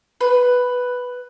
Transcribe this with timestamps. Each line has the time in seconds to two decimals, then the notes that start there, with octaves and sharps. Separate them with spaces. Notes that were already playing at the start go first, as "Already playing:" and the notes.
0.21 B4